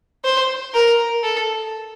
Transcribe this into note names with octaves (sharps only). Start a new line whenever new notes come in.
C5
A#4
A4